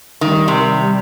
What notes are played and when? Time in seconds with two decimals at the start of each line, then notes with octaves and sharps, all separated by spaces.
0.21 D#3 G3
0.48 C3